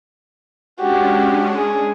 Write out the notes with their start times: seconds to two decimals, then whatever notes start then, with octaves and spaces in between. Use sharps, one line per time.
0.80 G#3 C#4 D4 F#4 G4
1.56 G#4